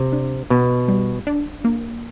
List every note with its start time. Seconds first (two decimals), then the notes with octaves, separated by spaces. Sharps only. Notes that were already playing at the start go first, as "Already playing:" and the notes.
Already playing: C3
0.13 D4
0.50 B2 B3
0.88 G3
1.27 D4
1.65 A#3